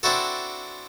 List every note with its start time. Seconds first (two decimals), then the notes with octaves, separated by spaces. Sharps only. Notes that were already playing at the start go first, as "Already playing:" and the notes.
0.03 C4 D4 E4 F#4 A4